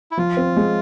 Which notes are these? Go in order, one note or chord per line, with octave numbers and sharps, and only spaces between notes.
E4
F3 F4
C4
G#3